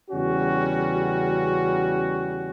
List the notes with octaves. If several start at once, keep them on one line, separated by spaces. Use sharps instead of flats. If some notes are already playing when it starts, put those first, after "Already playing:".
E2 C#3 G3 C#4 F#4